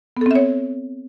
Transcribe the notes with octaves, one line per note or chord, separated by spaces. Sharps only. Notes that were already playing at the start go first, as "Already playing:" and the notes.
B3 C4 A4 C#5 E5